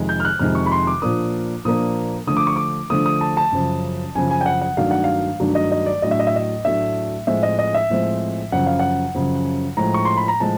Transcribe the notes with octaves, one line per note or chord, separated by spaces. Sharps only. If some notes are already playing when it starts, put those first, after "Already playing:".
Already playing: F2 C3 D#3 G#3
G6
F6
F#6
F2 C3 D#3 G#3 F6
C#6
B5
C6
D6
A#2 F3 A#3 D4 D#6
A#2 F3 A#3 D4 D#6
D3 F3 A3 D#6
D6
C#6
D6
D3 F3 A3 D#6
D#6
A5
A5
F#2 C#3 F3
F#2 C#3 F3 G#5
G#5
G5
F#5
F#5
G2 D#3 F#3 A3 D4 F5
F#5
F5
G2 D#3 F#3 A3 D4
D#5
D#5
D5
A2 F#3 A3 D4 D#5
E5
D#5
E5
D#5
A2 F#3 A3 D4 E5
A2 F3 G#3 C4 E5
D#5
D#5
E5
A2 F3 G#3 C4
F#2 C#3 F3 F#5
F5
F#5
F#2 C#3 F3
A2 F3 G#3 A#5
C#6
C6
B5
A#5
A2 F3 G#3 A5